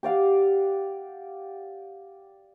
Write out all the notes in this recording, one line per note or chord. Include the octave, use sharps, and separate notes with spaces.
G4 D5 F5 F#5